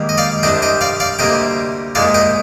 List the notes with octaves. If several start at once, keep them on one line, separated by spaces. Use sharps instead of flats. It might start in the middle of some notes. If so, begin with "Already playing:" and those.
Already playing: G#2 D#3 G3 A#3
D#5
D5 F5
C2 C3 G3 D4 D#5 G5
D#5 G5
D5 F5
D5 F5
D2 C3 G3 A#3 D#5 G5
C2 A#2 G#3 D5 F5
D#5 G5